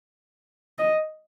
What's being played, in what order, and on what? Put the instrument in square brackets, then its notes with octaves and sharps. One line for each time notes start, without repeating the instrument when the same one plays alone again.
[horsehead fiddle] D#5